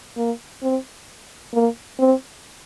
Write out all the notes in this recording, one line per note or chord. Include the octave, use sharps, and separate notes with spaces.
A#3
C4
A#3
C4